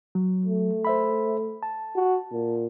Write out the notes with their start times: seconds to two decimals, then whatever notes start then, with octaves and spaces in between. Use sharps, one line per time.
0.15 F#3
0.45 A3
0.85 C5 E5 B5
1.63 A5
1.96 F#4
2.32 A#2